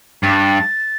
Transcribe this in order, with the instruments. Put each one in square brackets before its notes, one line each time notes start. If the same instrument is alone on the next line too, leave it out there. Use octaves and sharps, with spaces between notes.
[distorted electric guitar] G2 [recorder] A6